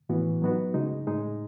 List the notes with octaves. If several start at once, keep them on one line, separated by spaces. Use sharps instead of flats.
A2 E3 B3 F#4
F#3 B3 D#4 F#4
C#3 G#3 D#4
A2 G#3 D#4